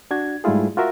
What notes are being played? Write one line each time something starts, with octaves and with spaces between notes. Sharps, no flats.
D4 F#4 G#6
G#2 G3 A3 E4 F4 G#4
F4 F#4 A#4 E5